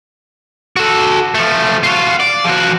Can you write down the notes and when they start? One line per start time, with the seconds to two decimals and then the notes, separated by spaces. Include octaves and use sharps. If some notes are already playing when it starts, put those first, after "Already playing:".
0.77 F#4 A4
1.35 F3 A3
1.83 F4 F#4
2.20 D5
2.45 F3 F#4